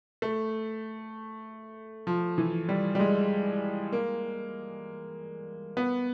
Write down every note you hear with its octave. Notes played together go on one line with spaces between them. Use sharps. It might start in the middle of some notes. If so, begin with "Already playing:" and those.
A3
F3
E3
G3
G3
G#3
A#3
B3